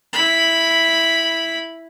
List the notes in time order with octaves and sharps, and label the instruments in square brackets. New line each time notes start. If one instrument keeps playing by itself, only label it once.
[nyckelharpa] E4 B5